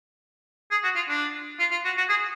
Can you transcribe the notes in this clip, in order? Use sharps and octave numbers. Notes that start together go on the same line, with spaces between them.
G#4
F#4
F4
D4
F4
F4
F#4
F#4
G#4